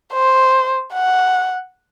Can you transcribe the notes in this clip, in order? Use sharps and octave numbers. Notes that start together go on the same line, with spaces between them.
C5
F#5